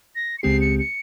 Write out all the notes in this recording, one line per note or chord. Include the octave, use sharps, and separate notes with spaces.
A#6
C#7
C#2 C#3 G#3 C4 G4 C7
C#7
C#7